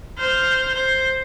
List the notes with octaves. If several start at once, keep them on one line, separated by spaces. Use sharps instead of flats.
C5 F6
C5